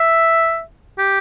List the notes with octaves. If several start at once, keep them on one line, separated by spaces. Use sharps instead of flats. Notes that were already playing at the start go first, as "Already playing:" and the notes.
Already playing: E5
G4